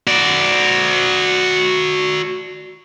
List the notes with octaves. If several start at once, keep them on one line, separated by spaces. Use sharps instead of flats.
F#4 D5